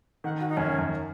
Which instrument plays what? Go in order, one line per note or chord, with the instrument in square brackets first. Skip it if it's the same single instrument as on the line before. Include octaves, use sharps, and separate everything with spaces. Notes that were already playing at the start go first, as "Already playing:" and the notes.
[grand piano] D#3 [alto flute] F#5
[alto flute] F#4
D#4
[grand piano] F#2 [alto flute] C#4
[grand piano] F#2